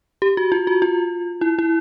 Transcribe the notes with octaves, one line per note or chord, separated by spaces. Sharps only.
G4
F#4
F4
F#4
F4
E4
E4